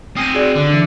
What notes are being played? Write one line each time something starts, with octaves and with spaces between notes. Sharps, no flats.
C4 G#5 D#6 A#6
F#4 G#4 D5
D3
E3 D4